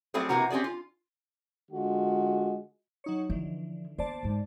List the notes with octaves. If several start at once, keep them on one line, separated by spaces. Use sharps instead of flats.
F#3 G3 A3 C4 G#4 C5
C3 E3 A#3 F#4 A#5
C4 C#4 G4 G#4 D5
F4
D3 G#3 F4 F#4
F#3 D#4 C#5
D3 E3 F3 E4
A#3 B3 C5 D5 A5
G#2 G#3